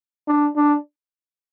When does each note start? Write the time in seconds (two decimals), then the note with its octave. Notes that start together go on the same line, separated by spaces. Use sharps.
0.28 D4
0.56 D4